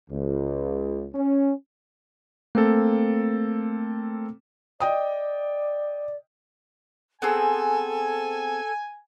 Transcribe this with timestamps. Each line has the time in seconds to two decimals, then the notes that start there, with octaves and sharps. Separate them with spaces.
0.10 C#2
1.14 C#4
2.55 A3 A#3 C4 A4
4.80 D5 D#5 G5 D#6
7.22 B3 C4 G#4 A4 G#5